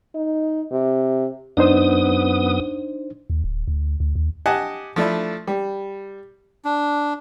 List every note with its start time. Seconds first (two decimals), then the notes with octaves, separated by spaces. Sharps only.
0.15 D#4
0.71 C3
1.57 F#2 B3 D4 D#4 C5 D#6
3.30 D#2
3.44 D1
3.68 D2
4.00 D2
4.15 D#2
4.46 G4 D#5 F#5 G#5 A5
4.96 F3 A3 D4 E4
5.47 G3
6.65 D4